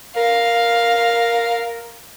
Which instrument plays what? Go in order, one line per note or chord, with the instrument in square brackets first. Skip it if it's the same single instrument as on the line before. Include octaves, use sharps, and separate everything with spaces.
[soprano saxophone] A#4 [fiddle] F5